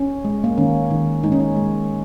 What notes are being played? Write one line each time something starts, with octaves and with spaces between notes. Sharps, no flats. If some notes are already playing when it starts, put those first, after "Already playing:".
Already playing: C#4
G#3
A#3
D#3 C#4
D#3
G#3 D#4
C#4
D#4
G#3